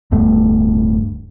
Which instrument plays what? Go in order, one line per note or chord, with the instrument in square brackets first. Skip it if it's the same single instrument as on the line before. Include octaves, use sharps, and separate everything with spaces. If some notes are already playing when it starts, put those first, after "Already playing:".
[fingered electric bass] D1 G2 A3 B3